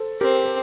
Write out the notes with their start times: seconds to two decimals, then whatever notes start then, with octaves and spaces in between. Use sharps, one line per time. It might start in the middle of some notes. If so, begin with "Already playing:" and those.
Already playing: A4 C5
0.21 C4 G4 A#4
0.45 A#4